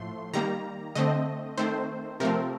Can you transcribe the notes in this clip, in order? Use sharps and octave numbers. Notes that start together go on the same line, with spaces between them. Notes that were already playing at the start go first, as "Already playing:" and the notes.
Already playing: A2 F3 A3 C6
D#3 G3 A#3 A#5
D3 A3 C4 D#5
D#3 A3 C4 C5
C3 F3 A3 C4 A#4